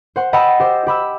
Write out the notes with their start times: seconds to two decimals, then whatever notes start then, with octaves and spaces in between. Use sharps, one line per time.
0.16 C5 F#5 C6
0.33 D#5 F#5 G5 A5 B5 E6
0.60 G4 C5 G5
0.87 G4 B5 E6